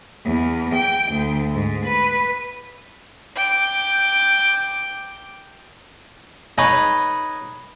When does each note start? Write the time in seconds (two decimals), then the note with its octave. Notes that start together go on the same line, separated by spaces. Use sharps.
0.25 E2
0.74 G5
1.12 D2
1.53 G#2
1.85 B4
3.36 G5 D6
6.58 D#4 G#4 B4 C#5